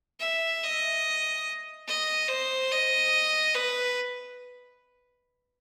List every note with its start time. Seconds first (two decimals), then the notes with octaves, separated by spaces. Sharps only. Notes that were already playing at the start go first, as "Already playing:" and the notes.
0.20 E5
0.63 D#5
1.87 D#5
2.28 C5
2.71 D#5
3.55 B4